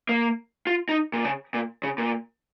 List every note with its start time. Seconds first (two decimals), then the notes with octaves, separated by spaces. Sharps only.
0.09 A#3
0.67 F4
0.89 D#4
1.14 A#2
1.24 C#3
1.54 A#2
1.83 C#3
1.98 A#2